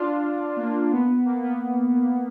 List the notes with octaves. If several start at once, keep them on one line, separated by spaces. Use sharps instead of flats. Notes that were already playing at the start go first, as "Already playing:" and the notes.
Already playing: D4 F4
A#3
B3
A#3
B3